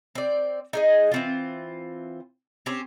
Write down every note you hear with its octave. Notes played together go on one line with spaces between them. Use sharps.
C4 D5
D#4 G#4 D#5
E3 C4 F4
C4 C#4 G4 C5